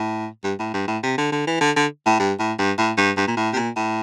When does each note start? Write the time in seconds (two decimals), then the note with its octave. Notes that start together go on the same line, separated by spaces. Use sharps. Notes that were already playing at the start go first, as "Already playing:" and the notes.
Already playing: A2
0.44 G2
0.59 A2
0.74 G2
0.88 A2
1.03 C3
1.18 D3
1.32 D3
1.47 E3
1.61 D3
1.76 D3
2.06 A2
2.19 G2
2.40 A2
2.58 G2
2.78 A2
2.97 G2
3.17 G2
3.27 A#2
3.37 A2
3.53 C3
3.56 A#2
3.76 A2